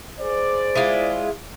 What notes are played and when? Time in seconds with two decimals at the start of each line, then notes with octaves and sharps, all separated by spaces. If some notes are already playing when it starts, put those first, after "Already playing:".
0.19 G#4 C5 D5
0.75 G#3 E4 F4